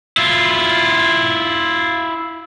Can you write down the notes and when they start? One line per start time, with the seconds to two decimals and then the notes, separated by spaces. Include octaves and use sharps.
0.17 E4 F4